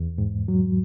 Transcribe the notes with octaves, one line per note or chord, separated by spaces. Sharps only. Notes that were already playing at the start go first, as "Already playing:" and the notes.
Already playing: E2
G#2
F#3